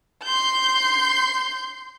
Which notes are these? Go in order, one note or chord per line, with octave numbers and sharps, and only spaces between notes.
C6 G6